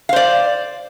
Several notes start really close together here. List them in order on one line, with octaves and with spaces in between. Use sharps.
F5 C5 D5